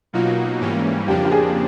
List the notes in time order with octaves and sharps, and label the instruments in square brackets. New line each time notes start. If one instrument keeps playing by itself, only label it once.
[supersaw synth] B2 F#3 A#3 D#4 F#4 [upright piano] F4
[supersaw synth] G#2 E3 G3 A#3 C#4
[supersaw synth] F2 C#3 F3 A#3 D4 [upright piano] G4
[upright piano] G4
G#4